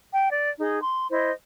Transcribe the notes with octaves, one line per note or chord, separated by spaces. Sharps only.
G5
D5
D#4 G#4
C6
E4 C5 D#5